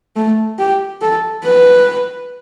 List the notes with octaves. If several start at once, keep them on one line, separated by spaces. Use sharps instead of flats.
A3
G4
A4
B4